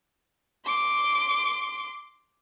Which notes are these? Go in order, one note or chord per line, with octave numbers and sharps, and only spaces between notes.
C6 D6